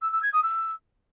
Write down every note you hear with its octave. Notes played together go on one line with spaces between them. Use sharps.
E6
E6
G#6
D#6
E6